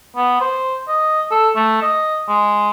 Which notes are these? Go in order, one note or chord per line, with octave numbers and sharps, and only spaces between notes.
B3
C5
D#5
A4
A3
D#5
G#3